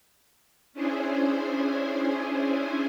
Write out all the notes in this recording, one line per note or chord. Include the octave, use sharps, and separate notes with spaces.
C#4 D4 E4 G#4 C5 G#5